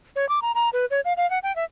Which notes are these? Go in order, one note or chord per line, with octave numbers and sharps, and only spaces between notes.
C#5
D6
A#5
A#5
B4
C#5
F5
F5
F#5
G5
E5